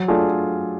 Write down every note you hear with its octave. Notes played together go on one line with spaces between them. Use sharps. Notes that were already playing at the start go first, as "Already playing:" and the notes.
Already playing: F#3
A3 D4 F4 G#4